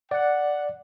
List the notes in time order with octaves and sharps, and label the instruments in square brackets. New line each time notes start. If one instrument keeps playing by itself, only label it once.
[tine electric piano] D5 [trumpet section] F#5